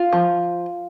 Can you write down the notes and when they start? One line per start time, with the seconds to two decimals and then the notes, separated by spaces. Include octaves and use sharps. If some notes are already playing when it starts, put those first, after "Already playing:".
Already playing: F4
0.13 F3